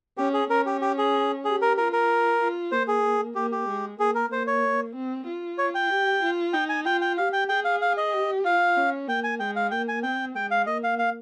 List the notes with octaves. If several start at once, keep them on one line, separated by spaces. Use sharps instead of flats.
C#4 G4
G#4
C#4 A#4
G4
G4
G#4
G4 G#4
A#4
F4 A#4
A#4
F4
A#3 C5
G#4
A#3 G4
G4
G#3
A#3 G#4
A#4
A#3 C5
C#5
C4
F4
C#5
G5
G4
F4
D#4 G5
G#5
F4 G5
G5
G4 F5
G5
G#4 G5
F5
F5
D#5
G4
F4 F5
C#4
A#3 G5
G#5
G#3 G5
F5
A#3 G5
G#5
C4 G5
G#3 G5
F5
A#3 D#5
F5
F5